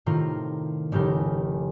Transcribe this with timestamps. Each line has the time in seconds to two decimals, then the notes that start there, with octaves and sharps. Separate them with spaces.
0.06 A2 C3 D#3 F4 A#4 A#5
0.92 F1 A2 C#3 G4 A#4 G6